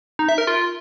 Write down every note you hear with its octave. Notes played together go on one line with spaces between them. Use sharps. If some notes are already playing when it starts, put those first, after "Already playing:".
D#4
E5
A#4
F4